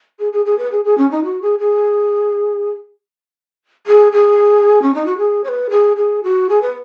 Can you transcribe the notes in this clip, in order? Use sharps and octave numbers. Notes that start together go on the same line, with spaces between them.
G#4
G#4
G#4
B4
G#4
G#4
C#4
D#4
F#4
G#4
G#4
G#4
G#4
C#4
D#4
F#4
G#4
C#5
B4
G#4
G#4
F#4
G#4
B4